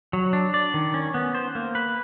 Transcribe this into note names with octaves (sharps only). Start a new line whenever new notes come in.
F#3
D4
D5
D#3
C#4
B3
C5
A#3
B4